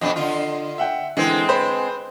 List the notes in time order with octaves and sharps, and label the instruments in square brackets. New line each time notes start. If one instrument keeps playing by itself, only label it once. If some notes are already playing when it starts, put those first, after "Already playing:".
[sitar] F2 B2 D4 [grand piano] D#5
[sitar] D3 F4
[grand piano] E5 F#5 G5
[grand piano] D3 E3 [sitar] G#3 C4
[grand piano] B4 C5 B5